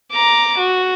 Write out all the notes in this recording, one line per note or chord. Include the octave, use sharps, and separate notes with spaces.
A#5 D6
F#4